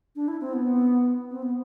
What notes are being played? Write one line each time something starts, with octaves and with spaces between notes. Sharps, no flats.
D4
E4
C4
B3
C4
B3